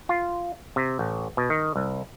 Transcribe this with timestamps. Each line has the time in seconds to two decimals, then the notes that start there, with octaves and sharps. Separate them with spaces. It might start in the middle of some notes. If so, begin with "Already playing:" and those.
0.09 F4
0.76 C3
0.99 A1
1.37 B2
1.50 D#3
1.76 C2